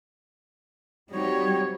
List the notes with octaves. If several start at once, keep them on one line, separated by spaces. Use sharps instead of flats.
G3 C4 D#4 F#4 G4 C#5